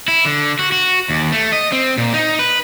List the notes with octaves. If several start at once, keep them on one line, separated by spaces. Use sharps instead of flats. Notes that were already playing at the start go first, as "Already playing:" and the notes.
E4
D3
F#4
F#4
D#2
A3
D#5
C4
A#2
D#4
B4